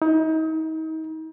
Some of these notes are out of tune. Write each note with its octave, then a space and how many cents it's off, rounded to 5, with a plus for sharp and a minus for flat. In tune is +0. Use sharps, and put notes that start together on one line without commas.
D#4 +35